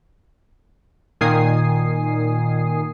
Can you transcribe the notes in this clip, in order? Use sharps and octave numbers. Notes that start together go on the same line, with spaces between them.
A#2 D#3 G#5 D#6 C7